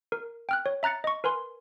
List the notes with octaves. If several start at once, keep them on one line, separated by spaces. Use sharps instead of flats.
A#4
G5 F6 F#6
C#5
E5 A#5 F#6 A6 C#7
D#5 C#6
A#4 B4 G#5 C6